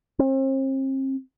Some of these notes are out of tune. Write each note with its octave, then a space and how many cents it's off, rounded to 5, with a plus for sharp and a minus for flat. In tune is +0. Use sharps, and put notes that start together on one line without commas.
C4 +40